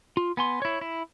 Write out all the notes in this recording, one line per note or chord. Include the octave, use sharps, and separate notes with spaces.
F4
B3 G#5 C6
E4 C#5
E4